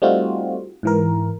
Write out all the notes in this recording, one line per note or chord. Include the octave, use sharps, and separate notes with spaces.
G3 A3 C4 D#4 F4 F#4
G#2 E3 A#4